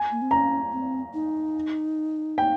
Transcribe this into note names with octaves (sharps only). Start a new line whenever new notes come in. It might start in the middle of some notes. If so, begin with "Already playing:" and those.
Already playing: G#5
A#3
C4
C#4 A#5
C4
D#4
G5